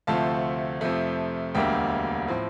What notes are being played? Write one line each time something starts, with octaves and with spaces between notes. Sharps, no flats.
D2 C3 F3 A3 C4 F5 A5
F2 C3 F3 A3
E1 D2 D3 G3 A#3 E5 G5
A2 F3 C4